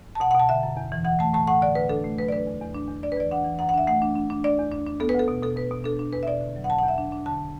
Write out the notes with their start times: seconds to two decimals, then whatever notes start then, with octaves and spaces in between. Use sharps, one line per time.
0.15 A5
0.20 B2 F#5
0.31 F#5
0.35 B2 A5
0.49 D3 E5
0.63 F#2
0.77 E2
0.92 E3
1.05 E3 F#5
1.19 A3 A5
1.33 A2 A5
1.47 A2 F#5
1.62 D3 D5
1.75 D2 B4
1.89 D4 A4
2.04 A3
2.18 F#3 B4
2.28 D5
2.32 D4 B4
2.46 E2
2.61 E2
2.75 D4
2.88 E2
3.03 D4 D5
3.12 B4
3.17 E3 D5
3.31 D4 F#5
3.45 E3
3.59 F#2 F#5
3.69 F#5
3.74 D4 E5
3.87 A3 F#5
4.02 D4
4.15 D4
4.30 D4
4.44 D4 D5
4.59 E2
4.72 D4
4.86 D4
5.00 B3 A4
5.09 B4
5.14 D2 A4
5.28 B2
5.42 B2 A4
5.56 B2 B4
5.71 B2
5.84 D4 A4
5.99 D4
6.12 E2 B4
6.23 E5
6.27 B2 D5
6.41 D3
6.56 F#3
6.64 F#5
6.69 B2 A5
6.79 F#5
6.84 E2 E5
6.98 D4
7.12 D4
7.26 D3 A5